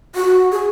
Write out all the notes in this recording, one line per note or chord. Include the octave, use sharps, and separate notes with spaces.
F#4
G#4